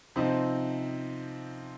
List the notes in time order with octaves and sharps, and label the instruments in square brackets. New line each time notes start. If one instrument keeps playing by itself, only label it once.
[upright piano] C3 F3 C4 D#4